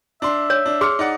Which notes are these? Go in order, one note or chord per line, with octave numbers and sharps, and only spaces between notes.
D4 E5 C6
C#5
D4
G#4 C6 F6 C#7
D#4 D5 F#5